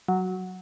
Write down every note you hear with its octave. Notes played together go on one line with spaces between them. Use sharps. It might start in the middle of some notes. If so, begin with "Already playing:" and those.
F#3